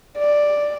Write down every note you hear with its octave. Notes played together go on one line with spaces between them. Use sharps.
D5